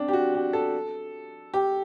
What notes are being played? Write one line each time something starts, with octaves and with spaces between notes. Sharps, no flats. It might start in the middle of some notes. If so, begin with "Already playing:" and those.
Already playing: C4 D4
G4
F#4
G4
A4
G4